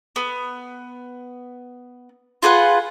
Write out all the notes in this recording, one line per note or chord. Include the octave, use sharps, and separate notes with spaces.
B3
F4 G#4 B4 F#5